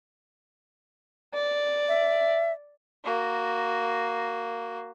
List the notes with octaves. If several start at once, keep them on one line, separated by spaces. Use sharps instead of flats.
D5
E5
A#3 F#4